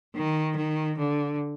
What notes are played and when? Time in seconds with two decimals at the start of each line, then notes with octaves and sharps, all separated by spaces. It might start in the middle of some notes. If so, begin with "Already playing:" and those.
0.16 D#3
0.57 D#3
0.98 D3